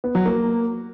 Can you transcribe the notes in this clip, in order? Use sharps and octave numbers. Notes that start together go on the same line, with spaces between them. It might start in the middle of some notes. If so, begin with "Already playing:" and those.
B3
F#3
A#3